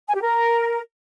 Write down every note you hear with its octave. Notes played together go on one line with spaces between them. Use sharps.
G#5
G4
A#4